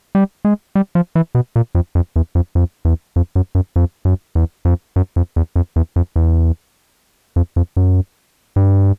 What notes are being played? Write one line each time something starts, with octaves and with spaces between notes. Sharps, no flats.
G3
G#3
G3
F3
E3
B2
A#2
F2
F2
E2
F2
F2
E2
F2
F#2
F#2
F2
F#2
E2
F2
F#2
F2
E2
F2
E2
F2
E2
F2
F2
F#2
G2